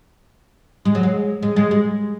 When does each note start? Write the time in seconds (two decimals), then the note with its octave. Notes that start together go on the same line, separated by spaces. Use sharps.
0.85 G#3
0.95 F#3
1.03 G#3
1.43 G#3
1.56 G#3
1.71 G#3